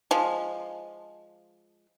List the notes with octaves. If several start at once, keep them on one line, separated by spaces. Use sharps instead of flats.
F3 G#3